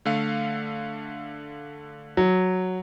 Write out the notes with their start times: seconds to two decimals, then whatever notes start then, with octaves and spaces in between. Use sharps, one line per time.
0.05 D3 A3 F5
2.17 F#3